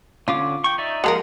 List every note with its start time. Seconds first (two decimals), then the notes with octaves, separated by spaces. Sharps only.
0.28 D3 C#4 F4 D6
0.64 G5 C#6
0.78 D#4 D5 E5
1.04 F3 G#3 A4 A#4 F5 F#5